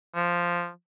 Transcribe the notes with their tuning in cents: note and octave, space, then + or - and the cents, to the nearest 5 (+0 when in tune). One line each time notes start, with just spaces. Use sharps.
F3 -5